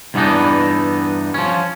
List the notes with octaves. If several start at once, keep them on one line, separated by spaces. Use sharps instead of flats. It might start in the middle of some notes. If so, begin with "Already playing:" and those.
E2 G2 E3 B3 D4 D#4
F3 C#4